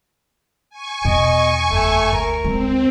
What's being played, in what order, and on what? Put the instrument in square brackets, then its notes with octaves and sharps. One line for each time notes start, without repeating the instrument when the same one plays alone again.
[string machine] G#5 C#6
[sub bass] E2 [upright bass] B2 [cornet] D#5
[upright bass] F#1 [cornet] A3
[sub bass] D2 [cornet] A#4
[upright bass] G#3 [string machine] C4